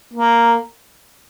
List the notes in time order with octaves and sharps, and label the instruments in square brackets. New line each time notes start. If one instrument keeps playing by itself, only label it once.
[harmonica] A#3